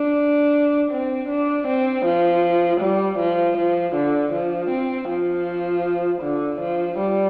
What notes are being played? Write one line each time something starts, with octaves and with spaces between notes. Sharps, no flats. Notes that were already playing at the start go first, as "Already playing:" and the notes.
Already playing: D4
C4
D4
C4
F3
G3
F3
F3
D3
F3
C4
F3
D3
F3
G3